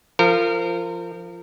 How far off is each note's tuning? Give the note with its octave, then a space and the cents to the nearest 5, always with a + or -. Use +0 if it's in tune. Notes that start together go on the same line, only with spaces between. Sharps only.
F3 -15 A#4 -35